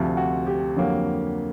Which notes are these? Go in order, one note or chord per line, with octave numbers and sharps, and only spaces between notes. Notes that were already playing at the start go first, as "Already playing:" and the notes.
Already playing: D2 C3 F3
F#4
G4
F2 D3 F#3 A#3